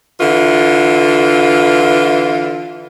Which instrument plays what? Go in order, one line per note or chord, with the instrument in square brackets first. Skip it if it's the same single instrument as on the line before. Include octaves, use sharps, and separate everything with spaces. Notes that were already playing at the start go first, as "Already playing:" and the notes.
[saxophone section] D3 E3 F4